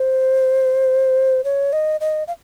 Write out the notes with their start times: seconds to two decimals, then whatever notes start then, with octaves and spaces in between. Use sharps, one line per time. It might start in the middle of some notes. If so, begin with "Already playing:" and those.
Already playing: C5
1.44 C#5
1.73 D#5
2.01 D#5
2.28 F5